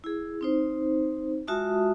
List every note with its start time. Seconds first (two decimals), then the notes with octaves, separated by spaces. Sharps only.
0.04 E4 G#4
0.41 C4 D#4 C5
1.47 G#3 F4 F#4 E5 A5 D#6